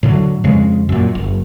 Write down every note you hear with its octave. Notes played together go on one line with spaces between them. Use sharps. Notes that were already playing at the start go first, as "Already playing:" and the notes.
A2 D3 F#3
F2 C#3 G#3
F#2 A#2
F#1